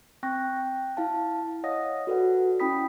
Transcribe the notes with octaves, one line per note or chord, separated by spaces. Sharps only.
C4 G5 C#6 F#6 A#6
G5
E4 F5 A5
C#5 D#5 F5 F#5 D#6 A#6
F#4 A4 B4 D5 F#5
C#4 E4 G5 B5 D#6 B6